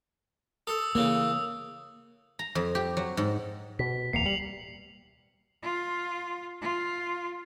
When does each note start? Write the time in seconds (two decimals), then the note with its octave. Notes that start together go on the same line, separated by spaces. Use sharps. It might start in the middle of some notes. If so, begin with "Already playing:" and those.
0.67 A4 D#6 E6
0.95 C#3 E3 A#3
2.39 A#5
2.55 F2
2.75 G4
2.97 F#3
3.17 G#2
3.79 B2 B6
4.13 D1 E2 A#3 C7 C#7 F7
4.26 G3 C#7 F#7
5.62 F4
6.61 F4